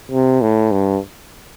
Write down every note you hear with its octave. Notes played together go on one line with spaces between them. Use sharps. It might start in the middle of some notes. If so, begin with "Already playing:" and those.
C3
A2
G2